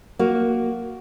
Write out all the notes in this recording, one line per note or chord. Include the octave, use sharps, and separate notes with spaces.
A#3 F#4